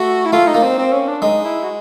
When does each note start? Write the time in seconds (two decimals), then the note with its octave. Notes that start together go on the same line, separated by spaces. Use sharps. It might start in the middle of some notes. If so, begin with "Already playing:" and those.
Already playing: A3 F#4
0.25 E4
0.33 A3 F4
0.47 D#4
0.54 A#3
0.63 C4
0.78 C4
0.93 C#4
1.08 D4
1.22 G#3 D#4
1.44 E4
1.63 F#4